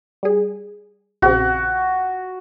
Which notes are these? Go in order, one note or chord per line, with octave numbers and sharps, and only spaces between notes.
G3 G#4
A#1 C#3 C4 F#4